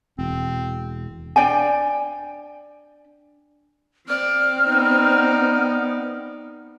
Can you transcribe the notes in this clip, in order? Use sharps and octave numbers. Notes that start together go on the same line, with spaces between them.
E1 C4
D4 D5 G5 G#5
C4 D5 F6
B3 D#4 D5